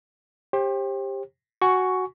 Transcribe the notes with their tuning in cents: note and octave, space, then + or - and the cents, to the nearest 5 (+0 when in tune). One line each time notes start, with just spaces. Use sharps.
G4 +15 C5 +35
F#4 +0 G#5 +0 C#6 +10